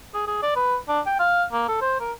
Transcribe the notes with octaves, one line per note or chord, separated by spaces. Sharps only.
G#4
G#4
D5
B4
D4
G5
F5
A#3
A4
C5
A#4